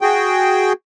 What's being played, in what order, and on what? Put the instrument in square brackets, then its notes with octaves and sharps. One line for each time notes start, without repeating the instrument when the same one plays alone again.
[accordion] F#4 G#4 G5